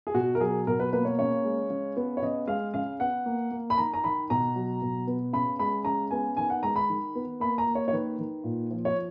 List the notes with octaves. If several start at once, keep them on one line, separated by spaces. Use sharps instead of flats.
G#4
B2 F#4
A#4
F#3 G#4
B2 A#4
B4
A#3 B4
C#5
C#3 C#5
G#3
C#3
B3
C#5
C#3 D#5
G#3 F5
C#3 F5
B3 F#5
A#3
A#3
B5
D#3 A#5
A#5
D#3 B5
B2 A#5
F#3
B2
B3
C#3 B5
G#3 B5
C#3 A#5
B3 G#5
D#3 G#5
F#5
G#3 A#5
B5
D#3
B3
A#3 B5
A#5
A#3
C#5
C#5
D#3 B4
D#3
A#2
F3
C#5